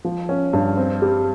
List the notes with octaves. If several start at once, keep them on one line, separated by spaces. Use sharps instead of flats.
F3
C#4
G2
C4
G3